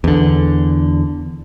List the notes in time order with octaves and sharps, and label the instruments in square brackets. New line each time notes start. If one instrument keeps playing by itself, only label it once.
[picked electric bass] E2 D3